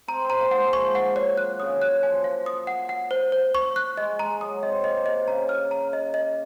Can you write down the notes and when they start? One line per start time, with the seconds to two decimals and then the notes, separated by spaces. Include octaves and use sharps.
0.08 C4 A#5
0.24 C4
0.30 A#5
0.40 A#3
0.51 F#5
0.56 G#3
0.73 F3 C#6
0.95 F#5
1.16 C#5
1.37 F#3 F#6
1.60 C#3 D#6
1.70 D#3
1.82 F#6
2.03 F3 G#5
2.24 F5
2.46 D#6
2.67 F#5
2.89 F#5
3.11 C5
3.32 C5
3.55 C#6
3.76 F#6
3.97 G#3 D#5
4.19 G#3 A#5
4.41 F#3 D#6
4.62 C4 D#5
4.84 A#3 D#5
5.06 C3 D#5
5.27 C#3 A#5
5.49 F6
5.71 A#5
5.93 D#5
6.14 D#5